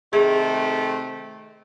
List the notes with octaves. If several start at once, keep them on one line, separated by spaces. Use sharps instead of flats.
C3 D#3 A3 G#4 G#6